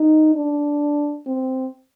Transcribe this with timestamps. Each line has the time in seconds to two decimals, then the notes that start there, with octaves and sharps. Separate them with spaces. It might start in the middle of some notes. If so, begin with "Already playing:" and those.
Already playing: D#4
0.35 D4
1.27 C4